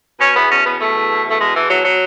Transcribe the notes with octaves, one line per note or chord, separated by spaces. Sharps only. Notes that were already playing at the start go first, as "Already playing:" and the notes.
B2 C#4
E2 B3
B2 C#4
E2 B3
B2 A3
E2
B2
E2 A3
B2 G#3
E2 E3
B2 F#3
F#3